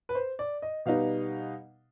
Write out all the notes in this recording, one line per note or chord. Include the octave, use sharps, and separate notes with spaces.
B4
C5
D5
D#5
B2 G3 B3 D#4 F5